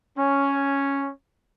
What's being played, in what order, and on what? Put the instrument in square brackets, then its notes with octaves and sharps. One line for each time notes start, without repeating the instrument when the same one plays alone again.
[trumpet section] C#4